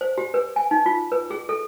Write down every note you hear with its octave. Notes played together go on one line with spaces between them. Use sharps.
C5
G4
B4
G#5
D#4
F4
B4
G#4
A4